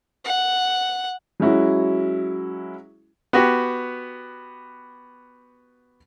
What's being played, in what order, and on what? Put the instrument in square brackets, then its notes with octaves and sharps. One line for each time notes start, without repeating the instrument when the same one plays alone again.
[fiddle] F#5
[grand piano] F#3 G#3 C#4 E4 F#4
[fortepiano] B3 F#4 G4